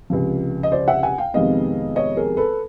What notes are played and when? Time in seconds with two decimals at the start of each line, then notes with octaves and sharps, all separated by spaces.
0.10 C#2 C3 F3
0.63 D#5
0.72 C5 D5
0.88 E5 F#5
1.03 F#5 G#5
1.18 F5 G5
1.34 F2 C3 D#3 G#3 B3 D#5 F5
1.96 C#5 D#5
2.17 G#4 A#4
2.37 A4 B4